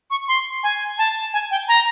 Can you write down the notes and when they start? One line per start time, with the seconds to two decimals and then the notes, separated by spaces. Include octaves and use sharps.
0.11 C#6
0.28 C6
0.63 G#5
0.98 A5
1.33 G#5
1.51 G5
1.68 A#5